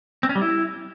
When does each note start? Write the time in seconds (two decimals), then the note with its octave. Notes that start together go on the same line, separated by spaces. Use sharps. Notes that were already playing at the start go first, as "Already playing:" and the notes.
0.23 C4
0.29 C#4
0.35 G3
0.42 E4